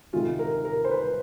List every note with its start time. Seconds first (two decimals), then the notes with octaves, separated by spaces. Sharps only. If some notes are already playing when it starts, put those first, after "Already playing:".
0.13 D2 C3 D#3 G#3 F4
0.39 A#4
0.65 A#4
0.84 C5
0.91 B4